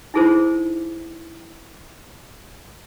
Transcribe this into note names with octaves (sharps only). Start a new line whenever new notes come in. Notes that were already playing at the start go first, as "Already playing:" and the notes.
D#4 E4 G#4 A4 C5